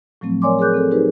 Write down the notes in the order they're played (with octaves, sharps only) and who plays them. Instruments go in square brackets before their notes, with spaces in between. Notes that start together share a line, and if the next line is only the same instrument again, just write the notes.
[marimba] A2 F3 F#3 A3 C4
A#4 C#5 D5 G#5 C6 D6
G#4 A#4 D6 F#6 G6
C4 A4
D#4 G4 G#4 A#4 B4